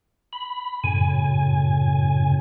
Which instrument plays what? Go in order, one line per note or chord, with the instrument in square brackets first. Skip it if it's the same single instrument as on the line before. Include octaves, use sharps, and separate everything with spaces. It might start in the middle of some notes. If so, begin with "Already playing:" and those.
[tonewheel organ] B5
F#2 A2 C#3 G#5